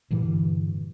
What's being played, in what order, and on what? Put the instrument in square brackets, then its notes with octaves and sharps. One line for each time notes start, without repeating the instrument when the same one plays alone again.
[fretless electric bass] G2 A#2 D3 E3